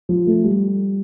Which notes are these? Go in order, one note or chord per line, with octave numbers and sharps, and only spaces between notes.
F3
A3
G3